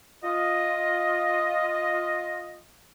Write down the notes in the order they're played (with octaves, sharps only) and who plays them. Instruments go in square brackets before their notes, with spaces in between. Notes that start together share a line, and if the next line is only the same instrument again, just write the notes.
[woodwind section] F4 D#5